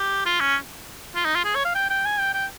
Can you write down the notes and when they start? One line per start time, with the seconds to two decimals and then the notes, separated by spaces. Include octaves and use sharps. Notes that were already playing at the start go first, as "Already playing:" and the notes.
Already playing: G4
0.26 F4
0.40 C#4
1.16 F4
1.25 D#4
1.35 F4
1.44 G#4
1.55 C#5
1.65 F5
1.75 G5
1.90 G5
2.05 G#5
2.19 G5
2.34 G5